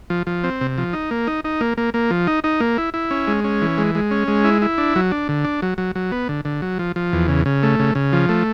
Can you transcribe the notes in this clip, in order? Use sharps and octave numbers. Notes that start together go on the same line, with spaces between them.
F3
F3
C4
C3
F3
D#4
A#3
D#4
D#4
A#3
A#3
A#3
F3
D#4
D#4
A#3
E4
E4
C#4
G#3
C#4
E3
G#3
G#3
C#4
G#3
E4
E4
D4
F#3
D4
D3
D4
F#3
F#3
F#3
B3
D3
D3
F#3
F3
F3
E2
C#3
C#3
A3
C#3
C#3
F3
A3